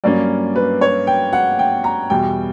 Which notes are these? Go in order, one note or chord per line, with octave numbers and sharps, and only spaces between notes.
G2 F#3 A#3 C#4 D5
B4
C#5
G5
F#5
G5
A#5
E2 B2 G3 G5